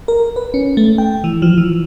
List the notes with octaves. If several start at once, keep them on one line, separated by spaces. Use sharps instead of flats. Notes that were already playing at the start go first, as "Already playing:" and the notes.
A#4
B4
C#4
A3
G5
E3
F3
E3